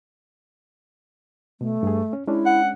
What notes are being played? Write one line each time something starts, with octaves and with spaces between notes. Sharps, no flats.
B2 A3
G2 G#4
C#4
G#3 C#4 D4 E4
F#5